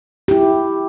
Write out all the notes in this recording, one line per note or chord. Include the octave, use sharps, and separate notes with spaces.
E4 G4